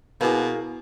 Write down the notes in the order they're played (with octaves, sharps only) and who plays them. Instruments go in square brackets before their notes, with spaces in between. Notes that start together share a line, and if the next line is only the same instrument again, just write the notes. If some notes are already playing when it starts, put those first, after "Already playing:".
[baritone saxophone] B2 [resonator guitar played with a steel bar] A#3 G#4 [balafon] E4 F#4 B4